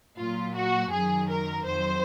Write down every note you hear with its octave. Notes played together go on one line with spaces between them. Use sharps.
A#2 F#3 F4
F#4
F#2 D#3 F#3 G#4
A#4
F2 D#3 F#3 C5